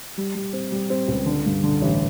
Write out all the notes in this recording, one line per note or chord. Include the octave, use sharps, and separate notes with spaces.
G3
G3
C4
G3
C4
C#2
D3
G2
D3
A1